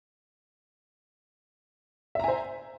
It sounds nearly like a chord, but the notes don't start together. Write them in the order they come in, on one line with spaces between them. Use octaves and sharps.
E5 A#5 G#5 C5